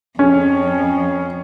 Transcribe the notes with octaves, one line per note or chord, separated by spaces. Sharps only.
F2 C#4